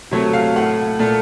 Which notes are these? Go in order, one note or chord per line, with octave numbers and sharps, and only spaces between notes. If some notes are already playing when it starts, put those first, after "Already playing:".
C3 F#3 A3 C#5
F5
A2 A3 F#5
A#2 A3